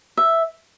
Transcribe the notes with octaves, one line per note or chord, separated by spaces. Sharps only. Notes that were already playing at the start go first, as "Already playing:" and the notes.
E5